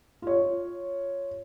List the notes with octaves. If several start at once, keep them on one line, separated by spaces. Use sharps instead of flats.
F4 C#5